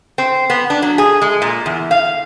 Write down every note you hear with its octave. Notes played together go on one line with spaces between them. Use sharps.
C4
B3
D4
F#3
G#4
G#3
A#2
E2
F5